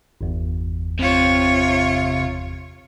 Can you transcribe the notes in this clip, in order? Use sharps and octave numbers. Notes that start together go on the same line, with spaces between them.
G1 E2
C3 F4 C#5